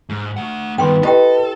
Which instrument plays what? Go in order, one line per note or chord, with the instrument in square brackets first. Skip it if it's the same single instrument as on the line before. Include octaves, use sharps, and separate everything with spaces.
[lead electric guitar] G#2
A3 F#5
[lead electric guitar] G2 D#3 [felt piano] B3 [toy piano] G5 C6
[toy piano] E4 G4 G5 [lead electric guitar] A4 [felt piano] B4 D#5